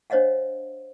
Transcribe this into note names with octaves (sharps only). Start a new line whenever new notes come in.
D4 C5 C#5 D#5 F5 F#5